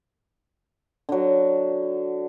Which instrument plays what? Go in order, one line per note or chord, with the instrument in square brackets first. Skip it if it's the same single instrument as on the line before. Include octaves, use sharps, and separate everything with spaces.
[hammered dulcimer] D3 F#3